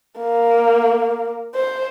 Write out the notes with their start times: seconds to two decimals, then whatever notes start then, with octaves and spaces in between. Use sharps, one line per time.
0.19 A#3
1.55 C5